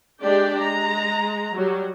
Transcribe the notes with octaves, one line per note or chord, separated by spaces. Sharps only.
G#3 D4 G4 D5 G5
G#3 A#5
F#3 G3